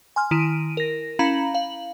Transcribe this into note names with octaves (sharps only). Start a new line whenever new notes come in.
G#5 C6 F6
D#3 E4 D7 D#7
A#4 A#6
C#4 E4 F5 A#5 B5 F#7
F5 F#7